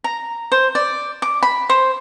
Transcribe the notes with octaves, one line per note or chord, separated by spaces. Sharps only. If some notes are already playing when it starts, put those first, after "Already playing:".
A#5
C5
D5
D6
B5
C5